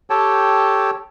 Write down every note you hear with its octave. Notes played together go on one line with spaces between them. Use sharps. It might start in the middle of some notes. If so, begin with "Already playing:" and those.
G4 A4 C#5 G5 A5